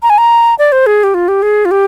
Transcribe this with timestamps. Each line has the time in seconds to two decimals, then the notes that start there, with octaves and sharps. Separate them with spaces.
0.03 A#5
0.10 G#5
0.18 A#5
0.59 D5
0.72 C5
0.86 G#4
1.04 G4
1.14 F4
1.28 G4
1.42 G#4
1.65 F4
1.71 G4